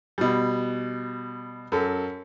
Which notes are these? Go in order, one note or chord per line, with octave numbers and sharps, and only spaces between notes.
B2 G3
F#2 A4